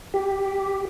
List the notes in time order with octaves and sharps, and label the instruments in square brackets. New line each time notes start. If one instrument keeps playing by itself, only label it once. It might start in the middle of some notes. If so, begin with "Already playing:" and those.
[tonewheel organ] G4